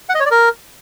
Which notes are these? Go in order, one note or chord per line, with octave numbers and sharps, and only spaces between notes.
F#5
D#5
C#5
D5
A#4